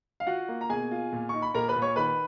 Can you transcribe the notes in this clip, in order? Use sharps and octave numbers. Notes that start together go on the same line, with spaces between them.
F5
F4 F#4 F#5
A#3
A#5
B2 G#4 G#5
F4
A#2
D#4 C#6
B5
A#2 A#4 A#5
B4 B5
A#2
C#5 C#6
D#3 B4 B5